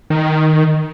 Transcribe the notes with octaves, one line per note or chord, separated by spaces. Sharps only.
D#3